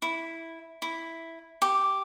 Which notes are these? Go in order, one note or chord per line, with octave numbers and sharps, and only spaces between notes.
E4
E4
G4